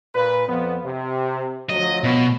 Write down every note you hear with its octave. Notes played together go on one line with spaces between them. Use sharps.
A#2 B4
F2 F3 B3
C3
D2 F3 F#3 D#5
B2